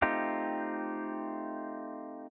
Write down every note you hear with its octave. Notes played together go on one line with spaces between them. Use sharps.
A3 C4 D#4 F4 G4